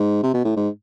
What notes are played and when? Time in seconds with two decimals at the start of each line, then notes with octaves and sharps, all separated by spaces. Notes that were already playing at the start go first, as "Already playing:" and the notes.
Already playing: G#2
0.23 C3
0.34 B2
0.45 A2
0.56 G#2